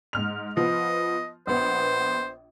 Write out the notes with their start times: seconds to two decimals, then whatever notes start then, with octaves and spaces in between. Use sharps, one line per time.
0.13 G#2 F6 F7
0.57 F3 B3 D#5
1.47 A#1 B3 C5